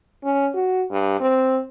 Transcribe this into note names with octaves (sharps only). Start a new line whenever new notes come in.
C#4
F#4
G2
C4